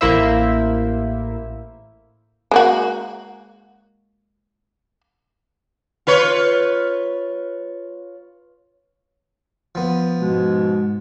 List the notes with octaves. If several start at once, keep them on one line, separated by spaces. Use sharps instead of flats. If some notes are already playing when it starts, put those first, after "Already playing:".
A1 A#3 E4 C5 E5
G#3 A#3 F#4
F4 B4 C#5
F3 B3
G#2 B2 G#3